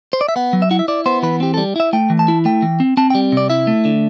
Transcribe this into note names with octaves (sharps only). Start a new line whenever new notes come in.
C5
D5
E5
B3 F#5
F#3
E5
E4 F#5
E5
E4 D5
B3 C5
E3 B4
C4 G4
G3 A4
E4 E5
A3 G5
E3
A5
E4
A3 G5
E3
C4
C4 A5
G5
G3
C3 D5
E4 E5
A3
D3